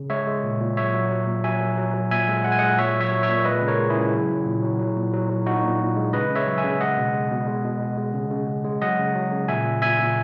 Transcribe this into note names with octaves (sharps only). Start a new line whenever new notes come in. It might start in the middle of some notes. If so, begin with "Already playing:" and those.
Already playing: C#3
G#3 C#5 E5
G#3
A#2
A#2
F#3 C#5 E5
F#3
F#3
A#2
F#3 E5 G#5
F#3
F#3
F#3
A#2 E5 G#5
G#3
G#3 F#5
G#5
G#3 D#5 F#5
A#2 C#5 E5
F#3
C#5 E5
F#3
C#5 E5
A#2
G#3 B4 D#5
C#3
A#4 C#5
G#3
E4 G#4
C#3
F#3
F#3
A#2
F#3
F#3
A#2
F#3
F#3
A#2 D#4 F#4
A#2
A#2
G#3
C#3 B4 D#5
C#3
C#5 E5
F#3
E5 G#5
C#3
G#3 D#5 F#5
B2
G#3
B2
G#3
B2
B2
G#3
C#3
C#3
C#3
G#3
F#3 D#5 F#5
C#3
F#3
C#3
A#2 E5 G#5
A#2
A#2 E5 G#5
A#2